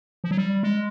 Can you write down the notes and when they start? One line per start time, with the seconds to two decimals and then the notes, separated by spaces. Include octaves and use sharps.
0.24 F3
0.31 F#3
0.37 G3
0.63 G#3